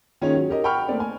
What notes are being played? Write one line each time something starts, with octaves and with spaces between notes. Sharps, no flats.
D#3 A#3 C#4 F4 G#4 C#5
F#3
G4 A#4 D#5
F#5 G5 B5 C#6 F6
A3 A#3 C4 D5
G#5